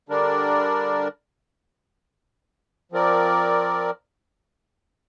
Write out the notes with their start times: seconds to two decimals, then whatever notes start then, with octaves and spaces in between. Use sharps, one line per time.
0.09 D3 G3 D4 A#4 D5
2.92 F3 C4 A#4 D5